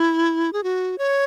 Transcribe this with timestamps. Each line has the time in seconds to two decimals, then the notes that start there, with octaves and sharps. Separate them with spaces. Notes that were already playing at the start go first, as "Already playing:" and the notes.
Already playing: E4
0.53 G#4
0.63 F#4
0.98 C#5